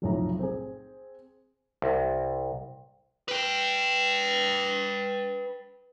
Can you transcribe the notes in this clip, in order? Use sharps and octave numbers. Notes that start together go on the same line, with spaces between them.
F1 B1 A2 F3 A#5
C4 G#4
C2
B4 G5